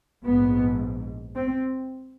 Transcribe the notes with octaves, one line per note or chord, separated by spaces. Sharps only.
A#1 G#2 B3
C4